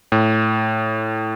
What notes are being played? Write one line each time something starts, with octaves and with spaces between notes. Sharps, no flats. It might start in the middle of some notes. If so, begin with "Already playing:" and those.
A2